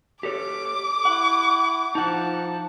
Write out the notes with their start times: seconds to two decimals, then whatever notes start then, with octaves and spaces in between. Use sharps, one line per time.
0.23 G4 A4 C#5 D6
1.05 E4 F#5
1.95 F3 D#4 F#5 A5